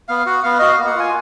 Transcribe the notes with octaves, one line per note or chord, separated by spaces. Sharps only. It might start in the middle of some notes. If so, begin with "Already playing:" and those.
B3 F5
F#4 F#5
B3 F5
F#4 D#5
F5
A#3
F#5
F4 G#5